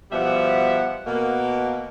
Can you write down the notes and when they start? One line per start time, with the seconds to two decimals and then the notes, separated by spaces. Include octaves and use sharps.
0.12 B2 F3 G3 E5 F#5
1.06 B2 A#3